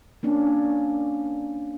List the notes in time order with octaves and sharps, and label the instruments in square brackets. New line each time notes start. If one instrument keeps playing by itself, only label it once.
[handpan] A#3 C#4 D4